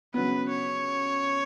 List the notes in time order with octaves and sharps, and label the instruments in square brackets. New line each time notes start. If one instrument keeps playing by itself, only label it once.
[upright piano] C#3 F#3 B3 [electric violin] B4
[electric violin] C#5